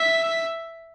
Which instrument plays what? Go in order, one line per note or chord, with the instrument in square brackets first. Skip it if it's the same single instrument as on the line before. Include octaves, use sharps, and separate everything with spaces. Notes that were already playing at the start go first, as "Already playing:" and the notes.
Already playing: [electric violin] E5